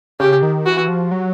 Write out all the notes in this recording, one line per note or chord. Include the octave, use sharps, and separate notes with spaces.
C#3 G4
D#3
E3 F#4
F3
F#3